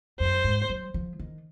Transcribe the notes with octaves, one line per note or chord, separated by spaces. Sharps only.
F#2 C5
G#2
F#3
F3
D#3